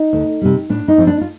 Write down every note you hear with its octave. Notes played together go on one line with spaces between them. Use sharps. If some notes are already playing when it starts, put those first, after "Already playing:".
Already playing: D#4
D2
C3 G3
A2 D4
D#4
F3 C4
D4
F4